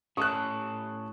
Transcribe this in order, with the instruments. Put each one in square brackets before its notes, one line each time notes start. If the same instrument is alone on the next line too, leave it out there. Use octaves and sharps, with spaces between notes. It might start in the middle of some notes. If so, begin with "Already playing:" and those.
[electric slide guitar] A2 C#4 A4 [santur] C#6 [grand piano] D#6 F#6